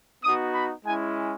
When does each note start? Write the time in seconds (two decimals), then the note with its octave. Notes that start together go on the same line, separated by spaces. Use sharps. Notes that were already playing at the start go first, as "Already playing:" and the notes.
0.23 B3 D#4 F#4 D#6
0.54 B5
0.85 G#3 C#4 E4 G#5